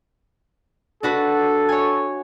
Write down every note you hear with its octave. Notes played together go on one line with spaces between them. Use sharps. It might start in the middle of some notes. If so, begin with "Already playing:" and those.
D4 F#4 A4 B4
C#5 G#5